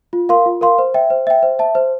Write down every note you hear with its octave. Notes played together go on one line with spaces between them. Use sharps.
F4
A#4 F5 C6
F4
A#4 F5 C6
C5
E5 G5
C5
E5 G5
C5
E5 A5
C5